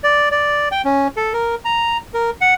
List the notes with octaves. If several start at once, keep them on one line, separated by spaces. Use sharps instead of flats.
D5
D5
G5
C#4
A4
A#4
A#5
A#4
F#5